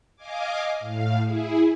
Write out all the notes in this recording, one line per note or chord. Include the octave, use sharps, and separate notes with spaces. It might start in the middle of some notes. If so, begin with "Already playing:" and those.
D#5 F5 G#5 D6
A2 F5
E4 G#4